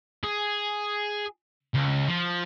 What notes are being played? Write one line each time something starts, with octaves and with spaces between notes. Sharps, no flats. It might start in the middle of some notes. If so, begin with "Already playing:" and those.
G#4
C#2
F3